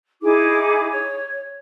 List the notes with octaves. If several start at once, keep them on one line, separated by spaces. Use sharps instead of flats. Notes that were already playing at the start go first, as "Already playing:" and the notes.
D#4 E4 G#4 D6
C#5